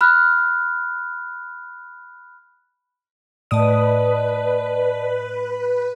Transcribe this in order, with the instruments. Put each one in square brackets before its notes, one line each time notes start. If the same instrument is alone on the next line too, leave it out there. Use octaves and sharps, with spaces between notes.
[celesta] B5 F6 F#6
[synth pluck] A2 D#6 [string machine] B4 [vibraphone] D5 D#5 A5